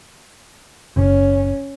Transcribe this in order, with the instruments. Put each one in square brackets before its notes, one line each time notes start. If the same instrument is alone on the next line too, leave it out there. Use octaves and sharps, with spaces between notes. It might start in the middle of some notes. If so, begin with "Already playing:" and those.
[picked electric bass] F#1 [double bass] C#4